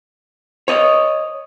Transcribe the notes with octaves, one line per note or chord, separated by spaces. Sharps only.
C#5 D#5